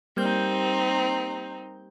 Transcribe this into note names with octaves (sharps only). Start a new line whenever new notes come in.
G3 A#3 C4 D#4 G6